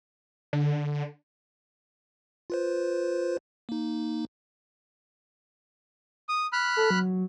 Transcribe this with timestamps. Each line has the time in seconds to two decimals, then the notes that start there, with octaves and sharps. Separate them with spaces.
0.53 D3
2.50 F4 B4 C5
3.69 A#3 D#4
6.29 D#6
6.53 B5 F6 F#6
6.77 A4
6.91 F#3